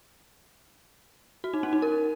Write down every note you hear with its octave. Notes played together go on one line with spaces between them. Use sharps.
F#4
D#4
C#4
D#4
A#4